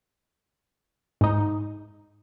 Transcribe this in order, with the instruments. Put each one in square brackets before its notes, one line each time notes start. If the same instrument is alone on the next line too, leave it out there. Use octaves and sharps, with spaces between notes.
[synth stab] G#2 D#4